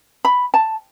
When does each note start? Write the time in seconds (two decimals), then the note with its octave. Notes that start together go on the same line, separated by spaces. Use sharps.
0.25 B5
0.54 A5